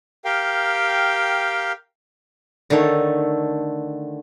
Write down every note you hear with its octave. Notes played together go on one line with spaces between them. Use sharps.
G4 A#4 F5 G5
D3 D#3 A3 C#5